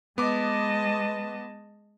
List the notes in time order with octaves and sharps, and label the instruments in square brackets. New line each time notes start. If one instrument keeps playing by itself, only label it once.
[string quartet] G#3 D#5 A5 [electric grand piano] B3 D6